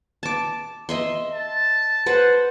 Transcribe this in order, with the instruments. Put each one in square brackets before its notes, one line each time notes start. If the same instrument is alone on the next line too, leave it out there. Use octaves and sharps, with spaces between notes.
[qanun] A5 D6
D#5 E5 C6
[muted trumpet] A5
[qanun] B4 C5 F#5